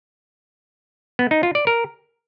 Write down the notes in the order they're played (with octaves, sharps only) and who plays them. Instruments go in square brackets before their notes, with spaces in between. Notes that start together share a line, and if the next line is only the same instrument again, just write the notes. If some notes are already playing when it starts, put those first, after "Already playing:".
[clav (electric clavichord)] B3
D#4
F4
D5
A#4